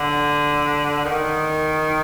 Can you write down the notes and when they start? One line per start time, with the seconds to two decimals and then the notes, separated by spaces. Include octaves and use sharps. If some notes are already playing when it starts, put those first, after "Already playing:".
Already playing: D3
1.05 D#3